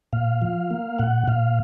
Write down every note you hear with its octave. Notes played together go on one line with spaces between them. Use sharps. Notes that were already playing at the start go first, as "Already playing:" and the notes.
A#2 F5
F3
A#3
A#2 F#5
A#2 F5